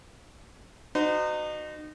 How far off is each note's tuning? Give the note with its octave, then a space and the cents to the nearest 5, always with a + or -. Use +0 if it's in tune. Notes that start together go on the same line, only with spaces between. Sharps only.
D#4 -30 F#4 +0 C5 -40